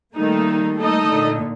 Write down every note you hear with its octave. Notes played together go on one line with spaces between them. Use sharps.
D#3 G3 A3 A#3 D#4
A3 D#4 A4 D#5
A#2 D3